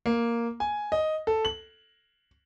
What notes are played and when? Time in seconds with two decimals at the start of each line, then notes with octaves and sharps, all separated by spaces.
0.06 A#3
0.60 G#5
0.92 D#5
1.27 A4
1.45 F#7